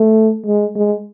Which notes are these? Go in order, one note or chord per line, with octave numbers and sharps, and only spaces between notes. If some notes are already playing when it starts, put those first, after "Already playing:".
Already playing: A3
G#3
G#3